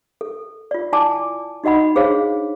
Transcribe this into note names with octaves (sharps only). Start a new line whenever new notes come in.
A4
F4 D5
E4 D5 G#5 A5 D6
D#4 F#4 D#5 F#5 B5
D4 G#4 C5 C#5 F5